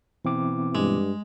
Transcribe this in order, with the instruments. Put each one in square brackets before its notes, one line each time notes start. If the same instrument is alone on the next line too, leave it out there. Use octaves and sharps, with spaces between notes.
[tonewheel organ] B2 B3 E4 [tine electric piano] E3 C4 D6
[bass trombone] G2 [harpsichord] G#3